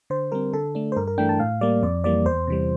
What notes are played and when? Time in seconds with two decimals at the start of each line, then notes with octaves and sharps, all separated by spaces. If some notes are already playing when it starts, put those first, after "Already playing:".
0.10 D3 C5
0.32 G3 C4 A#4
0.53 D3 A4
0.75 A3 D4
0.92 C5
0.96 G2 A#4
1.07 A#4
1.18 E3 A3 D4 G5
1.29 A5
1.40 A2 F5
1.61 G3 A#3 D5
1.83 F2 D5
2.04 E3 G3 A#3 D5
2.25 E2 C5
2.47 C3 E3 G3